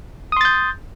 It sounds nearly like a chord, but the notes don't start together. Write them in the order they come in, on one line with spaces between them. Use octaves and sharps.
D#6 C6 A6 G6